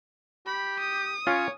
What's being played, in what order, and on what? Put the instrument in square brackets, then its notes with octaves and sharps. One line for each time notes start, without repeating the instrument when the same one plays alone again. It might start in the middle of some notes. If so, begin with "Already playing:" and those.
[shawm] G4 [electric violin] B5
[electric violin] D#6
[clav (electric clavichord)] C#4 F4 [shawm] C#5